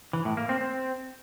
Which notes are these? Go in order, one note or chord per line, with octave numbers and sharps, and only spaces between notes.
E3
A2
A#3
C4
C4